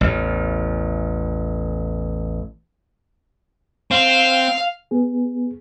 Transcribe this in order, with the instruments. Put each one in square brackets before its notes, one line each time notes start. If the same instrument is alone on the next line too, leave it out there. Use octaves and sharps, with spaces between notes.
[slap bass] A1 E2
[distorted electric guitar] C4 [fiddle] F5
[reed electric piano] B3 G#4